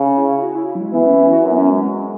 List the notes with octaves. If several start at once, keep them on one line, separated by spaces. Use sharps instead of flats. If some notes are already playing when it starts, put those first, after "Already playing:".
Already playing: C#3
E4
F#4
E4
E4
F#3
G#3
E3 B3
C#4
C#4
F#4
F#2 E4
B3
C#4
G#3
G#3